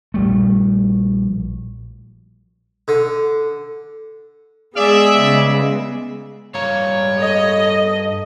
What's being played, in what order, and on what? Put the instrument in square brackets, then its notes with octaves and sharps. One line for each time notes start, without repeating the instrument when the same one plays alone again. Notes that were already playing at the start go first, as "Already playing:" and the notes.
[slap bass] A#1 G3 A3
[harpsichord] D3
[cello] G#3 B3 [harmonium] G#4 [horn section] D5 E5
[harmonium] C#3
[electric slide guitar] G2 F5 A#5 [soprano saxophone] C#5
[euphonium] A4 [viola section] D#5